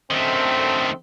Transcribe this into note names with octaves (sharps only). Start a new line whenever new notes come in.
F#2 D3 D#3 A3 C4